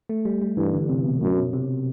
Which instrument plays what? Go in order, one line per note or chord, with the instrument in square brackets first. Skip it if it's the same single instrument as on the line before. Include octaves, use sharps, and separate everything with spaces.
[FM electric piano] A3
G3
G3
[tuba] G2 [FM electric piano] E3
[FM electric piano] D3
C3
B2
[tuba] F#2 [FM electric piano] A2
[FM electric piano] B2
C3